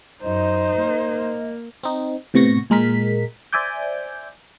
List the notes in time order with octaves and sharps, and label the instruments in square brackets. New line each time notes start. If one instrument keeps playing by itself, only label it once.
[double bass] F#2 [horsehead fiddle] D#4 C5 [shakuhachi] D#5
[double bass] A#3
[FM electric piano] C4 D#4
A2 C3 B3 C#6 A#6
A#2 G#3 A#4 B6
C5 D5 E5 G#5 D6 G6